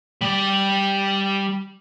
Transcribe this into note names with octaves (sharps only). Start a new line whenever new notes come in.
G3 D5